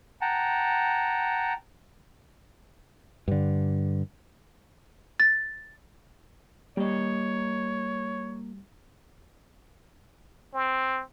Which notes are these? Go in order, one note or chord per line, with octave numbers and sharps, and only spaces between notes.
F#5 G5 A5 A#5
G2 D3
A6
G3 A#3 C#5 D#5
C4